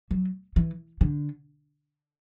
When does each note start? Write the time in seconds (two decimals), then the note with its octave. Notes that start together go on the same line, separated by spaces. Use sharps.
0.11 F#3
0.56 E3
1.01 D3